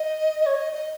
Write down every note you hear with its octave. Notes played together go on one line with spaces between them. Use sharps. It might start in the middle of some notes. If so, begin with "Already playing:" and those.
Already playing: D#5
C#5
D#5
D#5